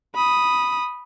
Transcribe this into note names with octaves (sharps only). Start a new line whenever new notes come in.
B5 D#6